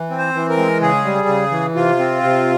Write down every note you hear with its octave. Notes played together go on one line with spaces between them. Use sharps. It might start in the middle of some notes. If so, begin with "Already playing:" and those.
Already playing: E3
C4
C5
E3
A#4
G#3
C#3 G#4
G3
C#3
E3
C3 F4
C4
C3